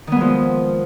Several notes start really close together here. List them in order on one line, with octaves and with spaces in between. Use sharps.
D#3 B3 G#3 F3